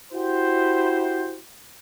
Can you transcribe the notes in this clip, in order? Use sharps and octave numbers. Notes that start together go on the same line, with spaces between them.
E4 F#4 G4 C5